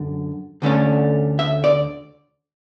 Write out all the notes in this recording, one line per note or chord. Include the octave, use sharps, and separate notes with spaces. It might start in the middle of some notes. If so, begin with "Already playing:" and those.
Already playing: F#2 D3
D2 D3 A3 C#4
E5
D5